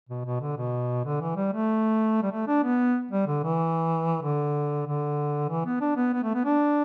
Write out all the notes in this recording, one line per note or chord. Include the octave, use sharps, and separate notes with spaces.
B2
B2
D3
B2
D3
E3
G3
A3
G3
A3
D4
B3
G3
D3
E3
D3
D3
E3
B3
D4
B3
B3
A3
B3
D4